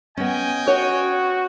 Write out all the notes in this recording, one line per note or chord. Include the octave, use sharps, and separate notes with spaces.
B3 C#4 D#5 G5 G#5
F#4 C#5